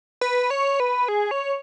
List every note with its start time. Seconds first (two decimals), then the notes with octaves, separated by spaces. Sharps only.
0.21 B4
0.50 C#5
0.80 B4
1.08 G#4
1.31 C#5